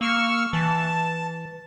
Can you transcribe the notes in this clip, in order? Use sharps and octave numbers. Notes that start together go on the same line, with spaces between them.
A#3 C#6 E6 F6
E3 A5